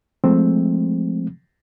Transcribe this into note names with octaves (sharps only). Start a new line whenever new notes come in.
F3 G#3 A3 C4